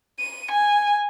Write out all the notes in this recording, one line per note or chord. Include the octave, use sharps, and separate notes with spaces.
D#7
G#5